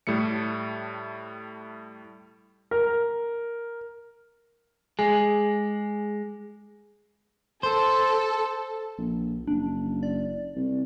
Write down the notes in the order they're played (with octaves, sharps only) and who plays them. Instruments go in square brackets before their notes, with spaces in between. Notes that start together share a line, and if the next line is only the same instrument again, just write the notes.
[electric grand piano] A2 G3 A3 C#7
[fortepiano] A#4
[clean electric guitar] G#3 [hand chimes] G#4 [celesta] G#5
[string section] A4 [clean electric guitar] C5
[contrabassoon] A#1
[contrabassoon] F#1 [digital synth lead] D4
[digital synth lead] D5
[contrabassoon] C2